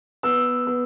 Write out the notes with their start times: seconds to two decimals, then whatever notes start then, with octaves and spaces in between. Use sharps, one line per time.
0.23 B3 E6
0.67 B3